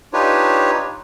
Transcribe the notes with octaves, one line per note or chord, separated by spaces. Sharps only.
D4 D#4 F4 G4 B4 C#5